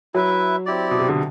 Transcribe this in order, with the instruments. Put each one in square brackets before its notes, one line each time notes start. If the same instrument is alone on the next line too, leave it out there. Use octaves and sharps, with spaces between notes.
[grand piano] F#3 [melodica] E4 B4 E5
[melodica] C4 E4 G4 D5
[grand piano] B2
C3
D3